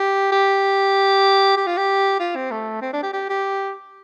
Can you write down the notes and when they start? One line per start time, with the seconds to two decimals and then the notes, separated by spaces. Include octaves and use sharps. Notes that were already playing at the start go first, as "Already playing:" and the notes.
Already playing: G4
0.32 G4
1.57 G4
1.67 F4
1.78 G4
2.20 F4
2.36 C4
2.51 A3
2.82 C4
2.93 D4
3.03 G4
3.13 G4
3.30 G4